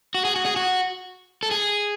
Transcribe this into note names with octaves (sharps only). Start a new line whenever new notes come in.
F#4
G#4
F#4
G#4
F#4
A4
G#4